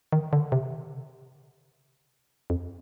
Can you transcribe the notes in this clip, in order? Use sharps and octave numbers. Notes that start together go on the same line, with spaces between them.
D#3
D3
C3
F2